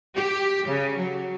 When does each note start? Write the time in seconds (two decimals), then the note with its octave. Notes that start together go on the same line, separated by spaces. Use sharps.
0.16 G4
0.67 C#3
0.96 F#3